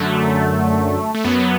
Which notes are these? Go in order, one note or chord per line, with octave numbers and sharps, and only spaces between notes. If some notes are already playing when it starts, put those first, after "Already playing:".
Already playing: F#2 D3 F#3 A3
A3
F#2 F#3 B3